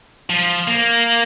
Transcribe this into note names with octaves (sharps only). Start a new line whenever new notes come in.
F3
A#3